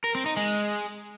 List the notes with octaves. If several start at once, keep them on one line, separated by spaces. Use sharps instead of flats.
A#4
C4
D#4
G#3